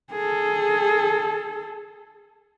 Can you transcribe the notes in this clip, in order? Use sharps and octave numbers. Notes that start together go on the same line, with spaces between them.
G#4 A4